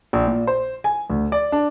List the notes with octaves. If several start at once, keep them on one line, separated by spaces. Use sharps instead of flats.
A#1
A#2
C5
G#5
D2
D5
D4